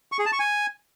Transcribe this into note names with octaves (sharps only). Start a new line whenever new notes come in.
C#6
G#4
A5
C#6
G#5